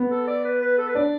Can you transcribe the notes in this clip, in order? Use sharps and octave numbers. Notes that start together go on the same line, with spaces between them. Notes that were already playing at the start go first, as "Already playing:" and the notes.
Already playing: B3
A4
D5
B4
B4
A4
B4
D4 D5